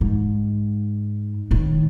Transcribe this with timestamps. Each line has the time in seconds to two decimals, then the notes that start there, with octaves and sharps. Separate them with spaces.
0.01 G#2
1.51 A2 D#3